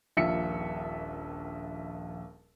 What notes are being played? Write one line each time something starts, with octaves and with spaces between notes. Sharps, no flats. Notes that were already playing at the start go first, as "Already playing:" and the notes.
D#1 A#1 F4 E5 C#7